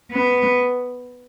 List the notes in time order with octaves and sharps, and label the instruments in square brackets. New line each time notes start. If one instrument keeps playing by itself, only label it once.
[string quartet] B3